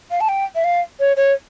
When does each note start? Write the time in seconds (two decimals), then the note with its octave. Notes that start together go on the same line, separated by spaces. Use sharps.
0.11 F5
0.20 A5
0.28 G5
0.55 E5
0.64 F5
1.00 C#5
1.16 C#5